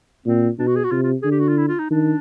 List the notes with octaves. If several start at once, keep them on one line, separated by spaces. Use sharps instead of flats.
A#2 C4
B2 D4
F#4
G#4
F#4
C3 F4
F4
D3 G#4
G4
F#4
F4
E4
F4
D#4
D#3 D4